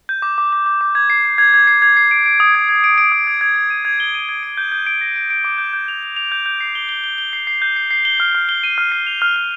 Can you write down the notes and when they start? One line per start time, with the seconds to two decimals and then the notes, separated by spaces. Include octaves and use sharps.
0.09 G6
0.22 D6
0.38 D6
0.53 D6
0.66 D6
0.81 D6
0.95 G#6
1.10 C7
1.25 C7
1.38 G#6
1.54 G#6
1.67 C7
1.82 G#6
1.97 C7
2.11 D7
2.26 D7
2.40 D#6
2.55 G#6
2.69 G#6
2.84 D7
2.98 D7
3.12 D#6
3.27 G#6
3.41 G#6
3.56 G#6
3.70 D#7
3.85 G#6
4.00 G7
4.15 D#7
4.29 G#6
4.43 D7
4.57 G6
4.72 G6
4.87 D7
5.01 A#6
5.16 D7
5.30 D7
5.44 D6
5.58 G6
5.73 G6
5.88 F7
6.03 F7
6.16 F7
6.32 G6
6.46 G6
6.61 C7
6.75 G7
6.89 G7
7.04 G7
7.18 G7
7.33 C7
7.47 C7
7.62 G6
7.76 C7
7.91 C7
8.05 G7
8.20 F6
8.35 F6
8.49 G7
8.64 D#7
8.78 F6
8.92 C7
9.07 F7
9.22 F6
9.36 F6